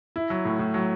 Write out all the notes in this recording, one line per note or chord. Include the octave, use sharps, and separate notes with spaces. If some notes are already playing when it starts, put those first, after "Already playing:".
E4
F#3
A2
A2
F#3